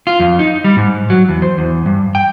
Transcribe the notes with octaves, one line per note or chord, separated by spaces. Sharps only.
F4
F2
D#4
G3
G#2
F#3
E2
C5
E2
G2
G5